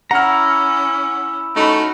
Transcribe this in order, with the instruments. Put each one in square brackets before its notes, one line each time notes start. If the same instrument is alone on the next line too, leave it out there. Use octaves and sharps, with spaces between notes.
[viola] C#4 [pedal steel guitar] E4 A#5 [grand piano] F#5 F6
[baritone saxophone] A3 [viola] C#4 F#4 [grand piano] D#4 B5